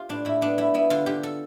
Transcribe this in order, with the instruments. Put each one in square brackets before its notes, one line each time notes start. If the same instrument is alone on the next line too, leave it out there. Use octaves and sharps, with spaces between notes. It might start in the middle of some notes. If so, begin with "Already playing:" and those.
Already playing: [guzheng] F4 G4
A2 D4
A2 E4
B3 D4
G3 E4
B3 E4
D3 F4
D3 G4
A4